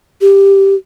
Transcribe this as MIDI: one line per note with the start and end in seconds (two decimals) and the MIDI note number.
0.21 0.74 67